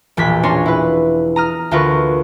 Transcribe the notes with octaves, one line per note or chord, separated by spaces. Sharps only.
E1 A#1 G#6 B6
C#4 D4 A#4 C#5 C6
E4 B4
A#5 D#6 F6
D2 F4 A#4 B4 C#6